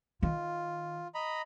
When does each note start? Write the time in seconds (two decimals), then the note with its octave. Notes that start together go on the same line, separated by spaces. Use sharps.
0.23 D#3 F4
1.14 D#5 A#5 B5